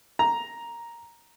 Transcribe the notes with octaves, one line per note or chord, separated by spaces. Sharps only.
A#5